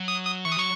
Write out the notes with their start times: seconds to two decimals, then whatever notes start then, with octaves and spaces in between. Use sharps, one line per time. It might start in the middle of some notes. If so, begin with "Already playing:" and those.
Already playing: F#3
0.08 D#6
0.25 D#6
0.45 E3 C#6
0.52 D#6
0.57 F#3 C#6